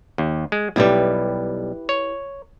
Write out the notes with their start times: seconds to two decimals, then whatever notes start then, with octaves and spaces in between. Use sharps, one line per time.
0.18 D#2
0.52 G#3
0.76 B1 G3 E4 G4 B4
1.89 C#5